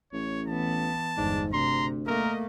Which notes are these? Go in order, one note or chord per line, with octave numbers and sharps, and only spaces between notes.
A1 C#5
E3 B3 A5
G1 E2 G#2 D4
D2 C3 A#5 C6
A3 A#3 A#4 D#5